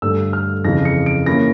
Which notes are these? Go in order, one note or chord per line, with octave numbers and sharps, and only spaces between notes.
G2 D3 A3 E6
F6
F2 C#3 E3 A#6
C#7
D7
E3 A#3 C#4 E4 A#6